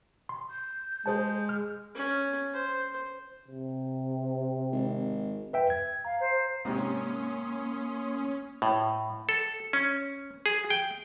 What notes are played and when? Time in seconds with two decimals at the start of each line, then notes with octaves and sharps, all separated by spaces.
0.29 C6
0.50 G6
1.06 G#3 G#4 C5 A5
1.49 F6
1.95 C#4
2.54 C5
3.48 C3
4.72 G#1
5.53 B4 E5 G5
5.70 G#6
6.05 F5 A#5
6.20 C5
6.65 G#2 C3 A#3 C#4 C6 D#6
8.62 A2
9.29 A4
9.73 C#4
10.46 G#4
10.71 G5